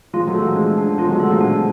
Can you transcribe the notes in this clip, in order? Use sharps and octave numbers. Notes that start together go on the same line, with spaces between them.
F3 G#3 F4
F#3 A3
A4
F3 G#3
F3 G#3 D4
D4
F3 G#3 F4
D3 F#3
F#3 A3 A4
F3 G#3
B2 D4